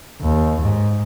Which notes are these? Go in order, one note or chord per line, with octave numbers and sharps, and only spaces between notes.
D#2
G#2